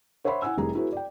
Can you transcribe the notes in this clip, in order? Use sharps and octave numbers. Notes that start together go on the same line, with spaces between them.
C5 C#5 E5 F#5 B5 C6
E4 F#5 G#5 E6
F1 G3 A3 E4 G#4 A#5
E4 F#4 G#4 A#4 C5
D5 G5